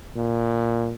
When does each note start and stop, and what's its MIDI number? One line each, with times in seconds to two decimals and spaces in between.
0.16 0.95 46